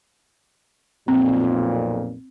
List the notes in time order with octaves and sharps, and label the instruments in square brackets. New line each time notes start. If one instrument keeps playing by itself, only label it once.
[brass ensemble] B1 F2 A#2 [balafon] C4